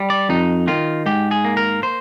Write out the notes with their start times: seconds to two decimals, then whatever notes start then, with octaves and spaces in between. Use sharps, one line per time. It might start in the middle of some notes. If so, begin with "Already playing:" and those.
Already playing: G3
0.10 D5
0.29 F2 D#4
0.67 D#3 F4
1.06 G#2 G4
1.31 G#4
1.44 A#3
1.57 A#4
1.83 C5